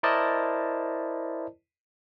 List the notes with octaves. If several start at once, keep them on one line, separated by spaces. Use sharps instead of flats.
E4 A#4 C5 D5 D#5 A5